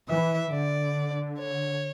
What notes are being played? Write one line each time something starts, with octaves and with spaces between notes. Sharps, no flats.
E3 E5
D3 D5
C#5